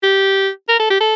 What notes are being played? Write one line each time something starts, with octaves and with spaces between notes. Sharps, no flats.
G4
A#4
A4
G4
A4